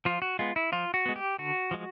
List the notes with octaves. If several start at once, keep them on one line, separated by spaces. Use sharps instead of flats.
F3 F4
F#4
G#3 B3 F4
E4
F3 F4
F#4
G#3 B3
G4
D3 F#4
F3 G#3